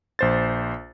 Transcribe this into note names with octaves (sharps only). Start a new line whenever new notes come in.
A#1 C5 A6